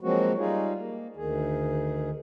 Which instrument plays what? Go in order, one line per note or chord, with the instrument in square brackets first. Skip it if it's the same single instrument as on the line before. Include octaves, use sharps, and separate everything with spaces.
[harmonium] F3 F#3 G#3 A#3 C4 F#4
G3 D#4 F4 G#4
A#3
D2 D#3 G#4